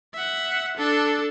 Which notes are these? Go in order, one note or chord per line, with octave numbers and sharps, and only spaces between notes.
E5 F#5
D4 A4